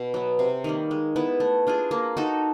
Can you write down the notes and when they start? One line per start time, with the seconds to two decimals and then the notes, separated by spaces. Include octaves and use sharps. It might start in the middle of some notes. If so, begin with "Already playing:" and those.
Already playing: B2
0.14 F#3 B3
0.39 C3
0.64 D#3 G3 A#3
0.91 G#3
1.16 B3 E4
1.40 A3
1.67 D4 F4 G#4
1.91 A#3
2.17 D#4 F#4 A4